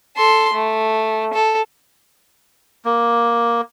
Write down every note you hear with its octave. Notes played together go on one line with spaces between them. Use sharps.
A4 C6
A3
A4
A#3